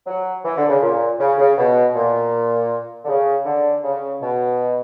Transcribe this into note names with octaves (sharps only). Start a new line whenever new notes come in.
F#3
E3
D3
C#3
A#2
C#3
C#3
B2
A#2
D3
C#3
D3
C#3
B2